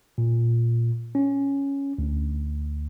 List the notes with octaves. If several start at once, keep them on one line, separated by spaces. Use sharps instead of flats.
A#2
C#4
D2